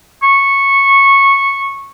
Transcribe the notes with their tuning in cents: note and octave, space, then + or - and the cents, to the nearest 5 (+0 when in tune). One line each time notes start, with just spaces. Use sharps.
C#6 -10